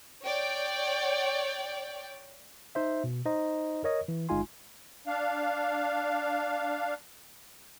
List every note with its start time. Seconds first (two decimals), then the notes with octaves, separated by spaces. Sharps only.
0.22 C#5 D5 G5
2.75 D#4 C5 E5
3.04 B2
3.25 D#4 C5 D#5 A#5
3.84 A#4 C#5 D#5
4.08 E3
4.29 G1 G#3 D#4 F4 G#5 C6
5.07 D4 F5